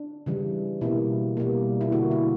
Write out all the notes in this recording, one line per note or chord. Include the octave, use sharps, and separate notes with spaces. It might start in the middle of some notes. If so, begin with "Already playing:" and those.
Already playing: D4
C#3 E3 G3
B2 G3 A#3 E4
B2 G3 A#3
E4
D3 A#3 F#4
E4